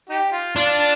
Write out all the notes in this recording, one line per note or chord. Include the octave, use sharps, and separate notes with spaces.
D#4 G4
F4
D4 F4